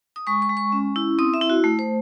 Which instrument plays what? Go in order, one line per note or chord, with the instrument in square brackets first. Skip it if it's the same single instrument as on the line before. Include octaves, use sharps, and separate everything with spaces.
[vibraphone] D#6
G#3 C#6
C#6
G#3
C#6
C#4
E4
C4 D#6
E5
E4
F#4
A3
C5